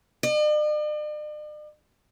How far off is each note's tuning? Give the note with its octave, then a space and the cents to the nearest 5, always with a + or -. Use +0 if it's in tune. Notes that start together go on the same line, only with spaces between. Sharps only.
D5 +45